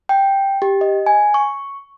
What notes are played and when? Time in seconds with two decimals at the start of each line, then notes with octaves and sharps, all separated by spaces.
0.09 G5
0.62 G4
0.81 D#5
1.06 G#5
1.34 C#6